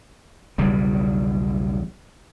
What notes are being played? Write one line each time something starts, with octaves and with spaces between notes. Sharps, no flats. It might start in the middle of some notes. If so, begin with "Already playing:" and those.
B1 E2 C#3 G3